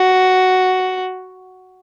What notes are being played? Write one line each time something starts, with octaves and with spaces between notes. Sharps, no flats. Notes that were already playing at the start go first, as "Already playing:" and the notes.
Already playing: F#4